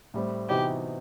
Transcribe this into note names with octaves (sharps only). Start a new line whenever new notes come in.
A2 G3 C4
C3 E3 B3 D#4 F#4 G4